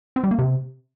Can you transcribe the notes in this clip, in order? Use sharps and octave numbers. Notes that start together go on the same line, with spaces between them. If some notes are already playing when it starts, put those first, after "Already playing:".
C4
G3
A#3
C3